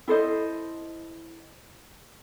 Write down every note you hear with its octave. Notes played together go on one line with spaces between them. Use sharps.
E4 A4 C5 D#5